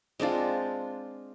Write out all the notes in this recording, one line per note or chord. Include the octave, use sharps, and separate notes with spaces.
G#3 C4 D4 F4